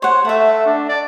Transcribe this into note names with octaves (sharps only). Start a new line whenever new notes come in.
C5 C#5 F#5
A3 E5 F#5
D4
D5